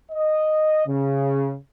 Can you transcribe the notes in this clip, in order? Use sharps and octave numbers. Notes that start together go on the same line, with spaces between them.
D#5
C#3